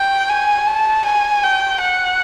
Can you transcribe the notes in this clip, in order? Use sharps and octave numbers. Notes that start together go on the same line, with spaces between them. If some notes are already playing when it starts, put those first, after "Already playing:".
Already playing: G5
G#5
A5
G#5
G5
F#5